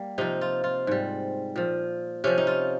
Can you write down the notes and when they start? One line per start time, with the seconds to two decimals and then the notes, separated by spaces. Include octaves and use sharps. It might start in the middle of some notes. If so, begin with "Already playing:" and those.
Already playing: G3 A#3
0.18 C3 F3 D#4
0.41 F4
0.64 F4
0.87 G#2 G3
1.56 A#2 F3
2.24 C3 F3 C#4
2.38 D#4
2.47 F4